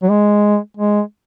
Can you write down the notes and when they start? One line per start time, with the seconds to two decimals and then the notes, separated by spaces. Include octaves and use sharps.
0.03 F#3
0.10 G#3
0.77 G#3